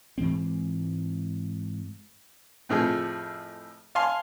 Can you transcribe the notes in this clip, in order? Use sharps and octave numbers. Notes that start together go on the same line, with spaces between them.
G#2 E3 G#3 C4
F2 A2 F3 G#4
F5 G#5 A5 C6 F6